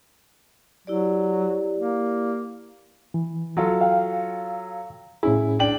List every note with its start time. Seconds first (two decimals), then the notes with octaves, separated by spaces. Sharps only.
0.87 F#3 E4 G4 D5
1.79 A#3
3.14 E3
3.57 F#3 F4 A4
3.81 F5 G5
5.23 A2 C#4 E4 G#4
5.59 D4 G5 F#7